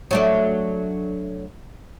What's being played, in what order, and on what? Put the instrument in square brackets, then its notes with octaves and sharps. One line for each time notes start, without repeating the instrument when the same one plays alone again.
[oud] F#3 A3 D4